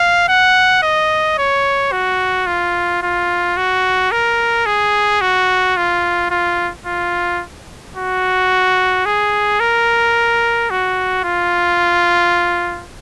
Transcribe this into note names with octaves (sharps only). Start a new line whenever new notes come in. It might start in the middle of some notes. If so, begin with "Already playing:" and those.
Already playing: F5
F#5
D#5
C#5
F#4
F4
F4
F#4
A#4
G#4
F#4
F4
F4
F4
F#4
G#4
A#4
F#4
F4